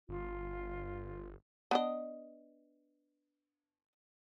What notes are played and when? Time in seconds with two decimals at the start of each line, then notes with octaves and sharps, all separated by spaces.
0.09 G1 F4
1.71 B3 D4 D#5